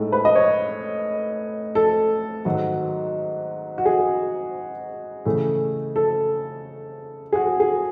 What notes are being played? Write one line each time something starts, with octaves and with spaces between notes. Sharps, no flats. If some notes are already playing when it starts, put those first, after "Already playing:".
Already playing: A2 G#3 D#4 A4
B4
D#5
C#5
A4
G#2 D#3 F#3
F#4
G#4
C#3 E3 A3
A4
G#4
F#4
G#4